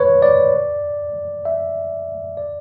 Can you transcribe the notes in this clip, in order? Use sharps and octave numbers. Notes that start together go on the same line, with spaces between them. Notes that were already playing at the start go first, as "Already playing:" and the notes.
Already playing: B4 C#5
D5
E5
D5